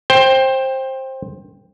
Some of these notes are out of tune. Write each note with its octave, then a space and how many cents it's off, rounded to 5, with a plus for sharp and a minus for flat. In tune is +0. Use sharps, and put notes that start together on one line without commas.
C5 +20 G5 +10